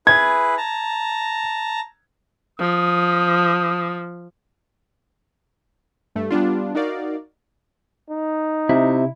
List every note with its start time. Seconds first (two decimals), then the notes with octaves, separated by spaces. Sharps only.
0.07 E4 G#4 B4 G#6
0.58 A5 A#5
2.59 F3 D#6
6.15 G2 A3
6.30 G3 B3 D4 F4
6.75 D#4 F#4 A#4 D5 F5
8.10 D#4
8.69 C3 E4